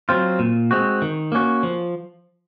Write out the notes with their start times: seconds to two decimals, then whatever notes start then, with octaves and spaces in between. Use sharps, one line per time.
0.09 F#3 C4 F4
0.39 A#2
0.71 G#3 C4 F#4
1.02 D#3
1.32 A#3 C#4 F#4
1.63 F3